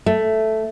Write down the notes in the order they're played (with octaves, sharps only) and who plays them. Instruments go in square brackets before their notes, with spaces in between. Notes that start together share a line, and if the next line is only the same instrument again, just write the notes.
[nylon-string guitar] A3